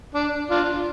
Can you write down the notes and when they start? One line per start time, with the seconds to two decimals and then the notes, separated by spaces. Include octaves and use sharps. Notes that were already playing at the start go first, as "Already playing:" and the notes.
0.15 D4
0.50 D4 F4